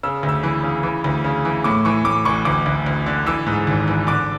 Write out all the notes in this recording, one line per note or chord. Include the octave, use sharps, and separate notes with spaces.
C#3 E6
D2
E6
E3
C#3
E3
D2
C#3
E3
A2 D6
E3 C#6
A2 D6
A1 C#6
D2 D6
D2
D2
D3
E3 E6
G#2
G#1
E3
D3 D6